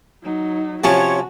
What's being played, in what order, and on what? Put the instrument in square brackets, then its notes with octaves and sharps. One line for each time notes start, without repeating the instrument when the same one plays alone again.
[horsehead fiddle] F#3 D#4
[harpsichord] C3 F3 C#4 [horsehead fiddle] F#4 [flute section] C#5 [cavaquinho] G#5 A5 C#6